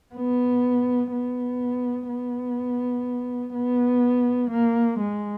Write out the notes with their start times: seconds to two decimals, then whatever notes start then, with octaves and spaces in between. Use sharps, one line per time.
0.15 B3
1.12 B3
2.09 B3
3.54 B3
4.51 A#3
5.00 G#3